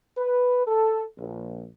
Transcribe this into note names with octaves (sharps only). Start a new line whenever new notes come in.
B4
A4
A#1